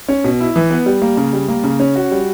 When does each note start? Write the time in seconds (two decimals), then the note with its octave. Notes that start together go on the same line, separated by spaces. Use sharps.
0.08 C#4
0.24 B2
0.40 E4
0.56 E3
0.70 B3
0.86 G3
1.02 A#3
1.17 C#3
1.33 G3
1.48 A#3
1.64 C#3
1.80 C#4
1.96 F#4
2.11 G3